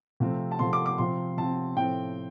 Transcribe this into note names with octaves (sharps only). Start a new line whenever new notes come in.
C3 F3 A3 C4
A5
C3 F3 A3 C4 C6
D6
D6
C3 F3 C4 C6
C3 F3 C4 A5
A2 F3 A3 C4 G5